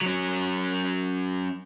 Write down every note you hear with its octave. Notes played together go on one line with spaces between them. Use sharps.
F#3 C#4